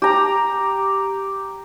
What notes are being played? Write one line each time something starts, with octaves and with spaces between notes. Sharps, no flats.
G4 A#5